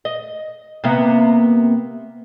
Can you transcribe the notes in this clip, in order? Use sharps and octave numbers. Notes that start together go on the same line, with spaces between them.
D#5
C3 A#3 B3